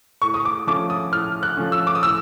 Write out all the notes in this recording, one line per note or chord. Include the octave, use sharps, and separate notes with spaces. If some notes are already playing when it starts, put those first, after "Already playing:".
A2 C#6
D#6
D6
F3 A3 C#4 D6
D#6
A2 F6
F#6
F3 A3 C#4
E6
D6
D#6
A2 E6